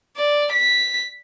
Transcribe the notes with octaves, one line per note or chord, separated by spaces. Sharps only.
D5
B6